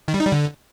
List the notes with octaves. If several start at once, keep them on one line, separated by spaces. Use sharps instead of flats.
D#3
G3
D#4
G3
D3